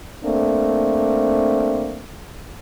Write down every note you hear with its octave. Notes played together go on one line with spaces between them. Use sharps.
A3 A#3 C4 D4